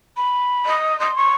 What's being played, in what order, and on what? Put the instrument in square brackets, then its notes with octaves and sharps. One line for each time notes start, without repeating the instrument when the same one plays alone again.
[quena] B5
[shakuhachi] D#5
[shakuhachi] D#5 [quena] C6
[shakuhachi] C#6